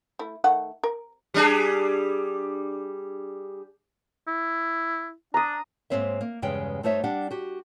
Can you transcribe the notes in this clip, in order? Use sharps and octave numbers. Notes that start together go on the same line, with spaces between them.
A3 E4
D#3 A3 F#5
A#4
G3 D4 G#4
E4
D4 A#5 D#6
G#2 G#3 A#3 C4 C#5 E5
A#3
E2 G2 C#3 G#3 G5
G2 A3 D#4 C5 C#5 E5
G3 D4 G4 D5 F#5
F#4 G4